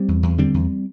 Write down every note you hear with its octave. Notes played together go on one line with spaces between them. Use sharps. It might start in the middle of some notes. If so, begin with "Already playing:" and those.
Already playing: G3 C4
E2
E2
D3 G3 C4
E2